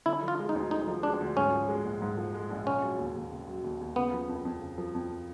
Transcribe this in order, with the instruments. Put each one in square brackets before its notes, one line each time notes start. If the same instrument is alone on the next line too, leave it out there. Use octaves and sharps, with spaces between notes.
[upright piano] D3 [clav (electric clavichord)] E4
[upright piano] F3
[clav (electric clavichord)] F4
[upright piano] G#3
[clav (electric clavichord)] D#4
[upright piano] D2
[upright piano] D3 [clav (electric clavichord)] D#4
[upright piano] F3
[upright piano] G#3 [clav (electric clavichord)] D4
[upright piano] D2
[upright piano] G#2 [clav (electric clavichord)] C#4
[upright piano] F3
G#3
A#1
G#2
F3
G#3
A#1
[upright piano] C#3 [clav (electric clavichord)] C#4
[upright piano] F#3
D#2
D#2
C#3
F#3
D#2
D#2
[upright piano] C#3 [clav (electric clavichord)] B3
[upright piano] F3
F2
F2
C#3
F3
F2